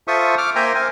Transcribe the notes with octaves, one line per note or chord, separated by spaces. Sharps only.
F4 A4 C5 E5 C#6 D#6
D6 F6
A#3 C5 E5 G5 G#5 A#5
A#4 C5 G#5